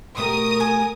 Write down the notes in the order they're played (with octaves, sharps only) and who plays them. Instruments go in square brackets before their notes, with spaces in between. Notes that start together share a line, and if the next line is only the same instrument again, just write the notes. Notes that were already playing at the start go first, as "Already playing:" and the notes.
[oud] B2 A3 G4 [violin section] A#4 D#6
[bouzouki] G#5